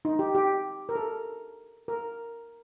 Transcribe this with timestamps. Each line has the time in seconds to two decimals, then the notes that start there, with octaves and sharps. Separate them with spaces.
0.05 D#4
0.19 G4
0.35 G4
0.89 A#4
0.96 A4
1.88 A#4